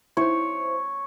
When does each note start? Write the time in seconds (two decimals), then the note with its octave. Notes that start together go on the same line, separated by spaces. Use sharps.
0.17 E4 C5 C#5